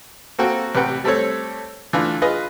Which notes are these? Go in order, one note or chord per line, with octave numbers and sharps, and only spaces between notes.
A#3 C4 F#4 A4 G5
A1 C3 B4 F#5 G5
G3 A3 C4 A4 C#5
E3 A3 D4 F4
F4 G#4 B4 D#5